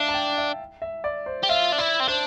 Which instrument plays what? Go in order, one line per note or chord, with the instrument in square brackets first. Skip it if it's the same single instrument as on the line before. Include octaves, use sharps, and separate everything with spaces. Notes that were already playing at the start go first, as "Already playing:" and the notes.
Already playing: [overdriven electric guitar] D4 [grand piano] E5 F5
[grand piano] A5
G5
E5
E5
D5
C5
[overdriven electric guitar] G4
[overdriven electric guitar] F4 [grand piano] E5
[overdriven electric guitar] D4
[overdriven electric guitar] E4 [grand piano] D5
[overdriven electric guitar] C4
[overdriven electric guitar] D4 [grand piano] C5